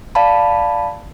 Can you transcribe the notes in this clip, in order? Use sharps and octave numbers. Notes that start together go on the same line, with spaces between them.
D5 F5 A5 B5